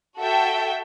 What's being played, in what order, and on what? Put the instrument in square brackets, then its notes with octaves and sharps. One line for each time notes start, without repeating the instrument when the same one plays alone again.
[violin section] F#4 A4 E5 G5